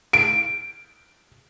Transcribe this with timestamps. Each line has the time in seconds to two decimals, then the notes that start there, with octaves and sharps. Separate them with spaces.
0.13 D7